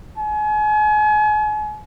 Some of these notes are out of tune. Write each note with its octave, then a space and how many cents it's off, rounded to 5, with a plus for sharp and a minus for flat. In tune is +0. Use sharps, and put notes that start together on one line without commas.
G#5 +35